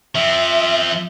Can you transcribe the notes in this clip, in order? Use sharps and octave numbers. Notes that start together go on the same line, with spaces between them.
F3 C4 E5